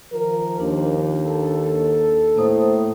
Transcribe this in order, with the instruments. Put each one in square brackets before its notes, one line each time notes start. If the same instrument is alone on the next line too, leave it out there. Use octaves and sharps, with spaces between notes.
[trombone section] D#3 F3 [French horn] A#4
[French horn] D#2 [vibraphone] D4
[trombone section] A4
[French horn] A2 [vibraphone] A#3 C5 D#6